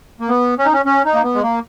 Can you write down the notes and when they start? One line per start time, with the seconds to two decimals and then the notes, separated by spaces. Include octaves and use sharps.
0.20 A#3
0.29 B3
0.59 C#4
0.65 D#4
0.73 C#4
0.86 C#4
1.05 D#4
1.14 A#3
1.23 B3
1.35 G#3
1.43 A#3